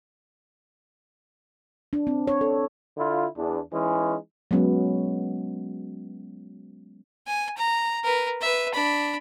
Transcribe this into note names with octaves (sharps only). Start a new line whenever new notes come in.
D4
C4
C#5
A4
D3 E4 F4
E2 D4
E3 G#3 C#4 D#4
F#3 G#3 B3 C#4
G#5
A#5
A#4 B4
B4 E5
D4 B5